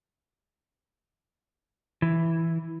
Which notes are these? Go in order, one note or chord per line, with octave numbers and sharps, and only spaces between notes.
E3